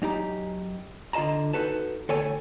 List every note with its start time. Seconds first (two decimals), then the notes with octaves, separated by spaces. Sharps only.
0.02 F#2 D#4 G4 A#5
1.13 D3 F4 D#5 A5 A#5
1.53 D#4 F4 F#4 A4 B4 A5
2.09 D2 A4 C#5 G5 G#5